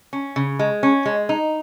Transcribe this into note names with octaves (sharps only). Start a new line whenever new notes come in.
C#4
C#3
G#3
C#4
G#3
D#4